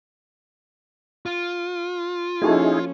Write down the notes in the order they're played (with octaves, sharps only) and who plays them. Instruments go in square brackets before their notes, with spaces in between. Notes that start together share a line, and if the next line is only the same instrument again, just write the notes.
[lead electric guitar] F4
[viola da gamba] F3 C#4 [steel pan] A#3 F#4 A4 [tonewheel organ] D#4 E4 G#4